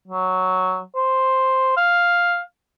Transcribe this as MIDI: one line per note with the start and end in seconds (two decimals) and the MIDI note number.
0.08 0.81 54
0.96 1.76 72
1.77 2.39 77